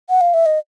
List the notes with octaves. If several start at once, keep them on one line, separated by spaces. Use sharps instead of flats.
F#5
F5
E5
D#5